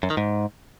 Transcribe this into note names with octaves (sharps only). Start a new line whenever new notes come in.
F#2
D#3
G#2